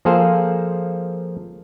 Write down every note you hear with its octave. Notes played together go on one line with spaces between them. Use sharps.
F3 A#3 G#4 A4 C5 F5